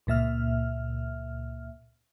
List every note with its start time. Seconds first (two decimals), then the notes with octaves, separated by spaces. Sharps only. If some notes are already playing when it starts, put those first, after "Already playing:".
0.07 C#2 A#2 E5 F6